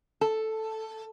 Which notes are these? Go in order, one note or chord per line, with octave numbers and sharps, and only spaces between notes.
A4